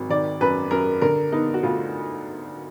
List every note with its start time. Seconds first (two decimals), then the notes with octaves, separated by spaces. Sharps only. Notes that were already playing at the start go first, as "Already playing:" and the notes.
Already playing: G#1 F#3
0.10 D#3 D5
0.41 F#2 B4
0.71 F#2 A#4
1.01 D3 A#4
1.32 B3 D#4
1.54 F#4
1.63 D2 F4